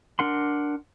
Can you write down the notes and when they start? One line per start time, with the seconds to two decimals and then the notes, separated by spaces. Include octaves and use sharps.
0.19 D4 A#4 F#5 C6